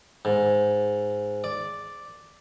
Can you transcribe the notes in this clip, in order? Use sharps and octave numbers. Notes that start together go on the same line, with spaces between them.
G#2
D5